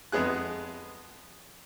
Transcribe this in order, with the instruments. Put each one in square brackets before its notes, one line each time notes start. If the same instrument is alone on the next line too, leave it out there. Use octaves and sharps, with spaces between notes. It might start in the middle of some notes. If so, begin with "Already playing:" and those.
[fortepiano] F2 G#3 B3 G#4 F#6